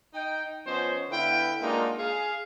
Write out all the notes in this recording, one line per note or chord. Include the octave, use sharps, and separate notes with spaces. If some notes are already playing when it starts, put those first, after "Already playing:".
D#4 G5
F3 B3 C#4 C5 C#5 D#5
D3 B3 E4 B4 F5 G5
G#3 A#3 D4 D#4 F4 F#4
G#4 F5